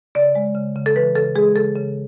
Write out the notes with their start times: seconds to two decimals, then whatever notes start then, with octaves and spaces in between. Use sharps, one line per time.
0.15 C#3 D5
0.35 G#3
0.55 C#3
0.76 C#3
0.86 A4
0.96 E3 B4
1.16 C#3 A4
1.35 G#3 G#4
1.55 C#3 A4
1.76 C#3